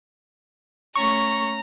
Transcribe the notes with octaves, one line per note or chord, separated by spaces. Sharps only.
A3 C#4 A#5 C#6